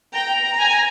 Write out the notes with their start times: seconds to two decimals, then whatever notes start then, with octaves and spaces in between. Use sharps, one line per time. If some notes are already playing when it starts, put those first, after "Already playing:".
0.13 G5 A#5
0.60 G#5